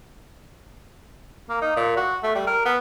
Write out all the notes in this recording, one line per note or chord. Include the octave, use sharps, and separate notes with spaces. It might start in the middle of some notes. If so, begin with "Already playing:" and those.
A#3
D#4
A#2
F#4
A3
G3
A#4
B3